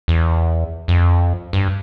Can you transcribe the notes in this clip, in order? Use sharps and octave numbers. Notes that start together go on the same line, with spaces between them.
E2
F2
G2